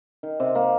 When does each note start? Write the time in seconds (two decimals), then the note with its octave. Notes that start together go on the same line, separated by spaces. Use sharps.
0.23 D#3
0.40 C3
0.55 A#3